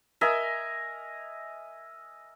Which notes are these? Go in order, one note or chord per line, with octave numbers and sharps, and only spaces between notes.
A#4 D#5 E5 G#5